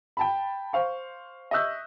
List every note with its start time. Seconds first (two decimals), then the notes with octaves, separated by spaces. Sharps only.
0.17 G5 A5 B5
0.73 C5 F5 C#6
1.51 D#5 E5 C#6 E6 F#6 G6